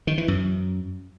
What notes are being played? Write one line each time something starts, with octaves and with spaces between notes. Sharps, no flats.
D#3
E3
F#2